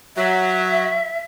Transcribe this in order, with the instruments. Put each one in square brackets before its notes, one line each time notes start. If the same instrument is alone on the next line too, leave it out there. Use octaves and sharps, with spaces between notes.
[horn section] F#3 [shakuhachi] E5